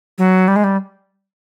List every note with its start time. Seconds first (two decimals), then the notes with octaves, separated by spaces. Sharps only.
0.18 F#3
0.48 G3
0.56 G#3
0.64 G3